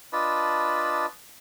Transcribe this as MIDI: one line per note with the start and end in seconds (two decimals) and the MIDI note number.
0.13 1.06 62
0.13 1.06 65
0.13 1.06 71
0.13 1.06 75
0.13 1.06 81
0.13 1.06 83